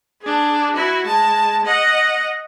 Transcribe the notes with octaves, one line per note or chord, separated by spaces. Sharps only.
D4 G#4
E4 F#4
G#3 A5
D#5 F#5